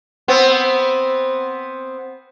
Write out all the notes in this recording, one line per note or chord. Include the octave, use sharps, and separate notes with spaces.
B3 C4